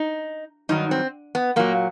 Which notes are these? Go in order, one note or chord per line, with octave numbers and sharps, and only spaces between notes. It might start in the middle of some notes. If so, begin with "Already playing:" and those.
Already playing: D#4
G2 D#3 F#3 D#4
C4
B3
A#2 F#3 A#3